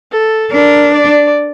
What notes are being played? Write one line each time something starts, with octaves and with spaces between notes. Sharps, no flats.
A4
D4 A#4
D5